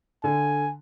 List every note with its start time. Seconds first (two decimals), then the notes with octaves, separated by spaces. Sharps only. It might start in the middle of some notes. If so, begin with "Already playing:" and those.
0.24 D3 G#5